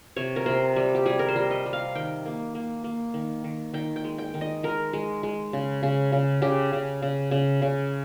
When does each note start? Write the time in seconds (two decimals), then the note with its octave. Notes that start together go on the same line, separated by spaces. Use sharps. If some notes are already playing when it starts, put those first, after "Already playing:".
0.17 C3 C#5
0.36 A#4
0.46 C3 C5
0.76 G3
0.95 G4
1.06 G3 G#4
1.19 A#4
1.28 C5
1.36 G3
1.51 D#5
1.66 G3
1.73 F5
1.95 D#3 G5
2.26 A#3
2.55 A#3
2.84 A#3
3.14 D#3
3.44 D#3
3.73 D#3 G5
3.96 G5
4.04 G#3
4.18 G5
4.34 D#3
4.41 D#5
4.63 G#3 A#4
4.93 G#3
5.23 G#3
5.53 C#3
5.83 C#3
6.12 C#3
6.42 C#3 G4
6.73 C#3
7.02 C#3
7.31 C#3
7.62 C#3